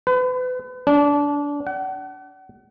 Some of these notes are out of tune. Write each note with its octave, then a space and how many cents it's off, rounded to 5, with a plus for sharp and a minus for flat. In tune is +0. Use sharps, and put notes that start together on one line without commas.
B4 +35
D4 -25
F#5 +40